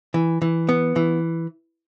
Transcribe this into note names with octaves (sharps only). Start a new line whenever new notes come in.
E3
E3
B3
E3